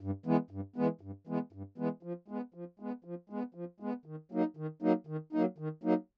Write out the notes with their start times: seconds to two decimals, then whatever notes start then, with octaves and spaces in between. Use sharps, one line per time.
0.01 G2
0.26 E3 G#3 B3
0.51 G2
0.76 E3 G#3 B3
1.01 G2
1.27 E3 G#3 B3
1.53 G2
1.78 E3 G#3 B3
2.03 F3
2.28 G#3 B3
2.54 F3
2.80 G#3 B3
3.05 F3
3.30 G#3 B3
3.55 F3
3.80 G#3 B3
4.06 D#3
4.32 F#3 A#3 D#4
4.57 D#3
4.82 F#3 A#3 D#4
5.07 D#3
5.33 F#3 A#3 D#4
5.58 D#3
5.84 F#3 A#3 D#4